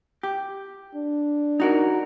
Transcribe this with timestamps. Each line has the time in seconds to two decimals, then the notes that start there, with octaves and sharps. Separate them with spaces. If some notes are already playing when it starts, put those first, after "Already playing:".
0.23 G4
0.95 D4
1.60 D#4 F#4 A#4